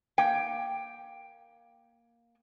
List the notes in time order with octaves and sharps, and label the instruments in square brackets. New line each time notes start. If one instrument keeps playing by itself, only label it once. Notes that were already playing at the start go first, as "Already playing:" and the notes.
[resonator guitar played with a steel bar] A#3 G5